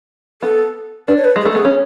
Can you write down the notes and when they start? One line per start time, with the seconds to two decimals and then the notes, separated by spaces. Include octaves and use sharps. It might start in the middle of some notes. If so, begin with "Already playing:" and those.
0.42 B3 A4
1.08 D4 B4
1.17 C#5
1.24 B4
1.36 G#3
1.41 G#4
1.45 A3
1.51 A4
1.55 B3 G#4
1.65 C#4